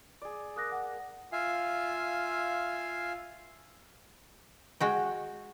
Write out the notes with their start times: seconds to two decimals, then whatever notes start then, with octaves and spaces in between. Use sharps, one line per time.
0.22 G#4 D5
0.56 A#3 D#6 F#6 A#6
0.72 F#5
1.32 F4 E5 F5 G#5
4.80 G#3 F#4 G5